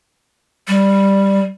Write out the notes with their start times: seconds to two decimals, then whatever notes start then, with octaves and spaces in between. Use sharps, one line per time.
0.68 G3